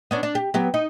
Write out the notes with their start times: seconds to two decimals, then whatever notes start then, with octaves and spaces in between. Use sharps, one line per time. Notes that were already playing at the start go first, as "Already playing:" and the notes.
0.11 B3 C#4 D4
0.23 D4
0.35 G4
0.54 F#3 B3 G4
0.74 D#4